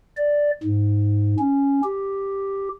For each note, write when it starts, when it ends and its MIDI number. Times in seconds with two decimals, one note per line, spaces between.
0.17 0.51 74
0.63 1.35 44
1.39 1.81 61
1.84 2.68 67